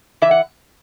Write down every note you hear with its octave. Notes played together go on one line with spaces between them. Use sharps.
E3 E5
F#5